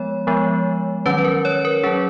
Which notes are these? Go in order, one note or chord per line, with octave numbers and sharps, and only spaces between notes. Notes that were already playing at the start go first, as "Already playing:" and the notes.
Already playing: F3 G#3 B3 C#5
F3 G#3 B3
D#3 F#3 C#4 B4
A#4
C#5
A#4
F#3 C#4 G#4